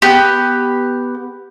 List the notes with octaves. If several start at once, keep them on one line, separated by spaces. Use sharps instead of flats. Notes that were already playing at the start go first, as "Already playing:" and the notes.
B3 G4